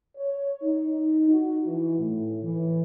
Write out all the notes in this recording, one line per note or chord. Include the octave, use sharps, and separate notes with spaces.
C#5
D#4
F#4
E3
A2
E3